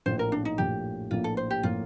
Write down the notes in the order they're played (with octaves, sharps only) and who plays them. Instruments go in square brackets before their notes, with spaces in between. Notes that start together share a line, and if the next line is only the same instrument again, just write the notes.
[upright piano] A#1 A2 F3 A#3 [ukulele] C5
[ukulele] A#4
D4
D#4
[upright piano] A#1 A2 F3 A#3 [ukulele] G4
[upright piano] A#1 A2 F3 A#3 [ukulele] F4
[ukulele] A4
C5
G4
[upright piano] A2 F3 A#3 [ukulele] F4